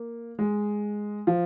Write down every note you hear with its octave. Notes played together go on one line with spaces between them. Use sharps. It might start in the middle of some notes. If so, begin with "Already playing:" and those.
Already playing: A#3
G#3
F3